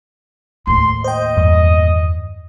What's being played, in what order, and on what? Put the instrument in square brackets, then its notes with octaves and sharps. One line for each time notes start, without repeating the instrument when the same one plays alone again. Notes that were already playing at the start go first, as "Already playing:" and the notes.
[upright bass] D#2 A2 [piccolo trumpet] C6
[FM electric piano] C5 G5 [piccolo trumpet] D#5
[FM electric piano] E2 G2